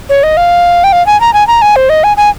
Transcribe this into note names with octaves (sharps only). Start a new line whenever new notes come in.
C#5
D#5
F5
G5
F5
G#5
A#5
G#5
A#5
G#5
C5
D#5
G#5
G#5